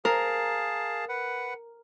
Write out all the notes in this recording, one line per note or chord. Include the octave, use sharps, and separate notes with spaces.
G#4 A#4 F5 A5
B4 F#5